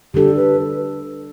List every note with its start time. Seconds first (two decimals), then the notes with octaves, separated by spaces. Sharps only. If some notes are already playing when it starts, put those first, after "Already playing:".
0.14 D3 G3 D4 G4 A4
0.36 B4